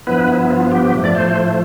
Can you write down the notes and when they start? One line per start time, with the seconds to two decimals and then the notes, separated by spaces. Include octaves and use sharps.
0.07 G2 F3 B3 E4 B4
0.28 E4
0.51 F4
0.65 F4
0.72 G4
0.94 A2 F3 A3
1.04 D5
1.15 C5